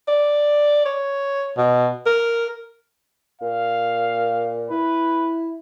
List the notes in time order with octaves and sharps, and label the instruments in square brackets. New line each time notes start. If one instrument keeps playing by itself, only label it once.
[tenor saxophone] D5
C#5
B2
A#4
[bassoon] A#2 [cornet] F5
[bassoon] E4 [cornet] B4